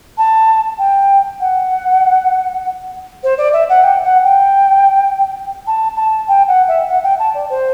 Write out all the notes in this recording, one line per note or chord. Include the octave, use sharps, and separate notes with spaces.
A5
G5
F#5
C5
D5
E5
F#5
G5
F#5
G5
A5
A5
G5
F#5
E5
F#5
G5
A5
D5
C5